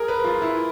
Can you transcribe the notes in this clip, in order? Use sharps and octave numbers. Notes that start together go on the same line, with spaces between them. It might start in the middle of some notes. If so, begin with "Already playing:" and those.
Already playing: G#4 A#4
B4
F4
E4